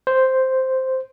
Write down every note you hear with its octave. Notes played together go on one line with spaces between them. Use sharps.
C5